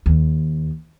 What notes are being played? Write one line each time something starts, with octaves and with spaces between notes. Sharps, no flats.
D#2